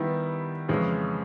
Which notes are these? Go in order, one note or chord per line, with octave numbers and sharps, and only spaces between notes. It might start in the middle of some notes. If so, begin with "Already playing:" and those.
Already playing: D#3 G3 B3 E4
F2 C#3 E3 G#3 C#4